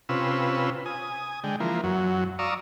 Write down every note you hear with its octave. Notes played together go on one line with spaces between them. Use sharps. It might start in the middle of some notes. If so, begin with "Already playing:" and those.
C3 C#4 F4 B4 E6
G#5 D#6
D3 G#3 G5
E3 F3 A#3
F#2 F#3
D5 F5 A#5 C#6 D#6 E6